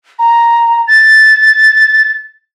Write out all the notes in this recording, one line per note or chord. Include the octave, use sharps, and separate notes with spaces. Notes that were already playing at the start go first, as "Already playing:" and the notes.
A#5
A6